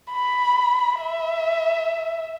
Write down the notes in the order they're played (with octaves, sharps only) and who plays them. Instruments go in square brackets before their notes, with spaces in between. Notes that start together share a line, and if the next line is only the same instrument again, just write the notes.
[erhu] B5
E5